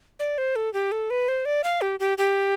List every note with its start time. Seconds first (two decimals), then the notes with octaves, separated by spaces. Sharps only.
0.19 D5
0.38 C5
0.56 A4
0.74 G4
0.92 A4
1.10 B4
1.28 C5
1.45 D5
1.64 F5
1.81 G4
2.00 G4
2.18 G4